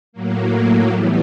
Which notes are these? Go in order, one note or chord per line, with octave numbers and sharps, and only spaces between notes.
A2 F#3 A#3
A2 E3 G3 B3